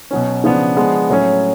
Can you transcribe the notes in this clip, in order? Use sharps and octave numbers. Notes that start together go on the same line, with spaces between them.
B2 F#3 C#4
C#3 F3 B3 D4
F3 G#3 B3 D4
A2 F#3 C#4